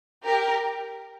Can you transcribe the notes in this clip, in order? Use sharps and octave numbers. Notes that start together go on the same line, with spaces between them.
G4 A#4